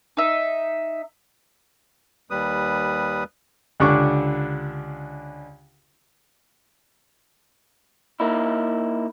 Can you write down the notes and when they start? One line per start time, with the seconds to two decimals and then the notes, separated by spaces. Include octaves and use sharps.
0.17 D#4 E5
2.30 D#2 G3 B4 D#6
3.80 C#2 D3 D4 G4 C#6 D6
8.20 A#3 D#4 E4